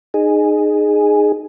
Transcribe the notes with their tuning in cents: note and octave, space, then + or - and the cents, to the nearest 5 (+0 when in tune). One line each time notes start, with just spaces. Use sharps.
D#4 -25 G#4 +0